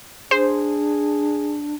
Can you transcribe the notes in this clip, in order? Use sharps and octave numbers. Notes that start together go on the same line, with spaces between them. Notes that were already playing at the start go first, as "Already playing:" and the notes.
D4 G#4 C5